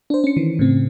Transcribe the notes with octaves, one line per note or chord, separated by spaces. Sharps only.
D4 C5
C#4 C#7
D#3 E3
A2 C#3 C4